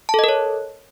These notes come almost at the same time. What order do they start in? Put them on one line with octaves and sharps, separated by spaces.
A5 A4 D#5 A#4 C#5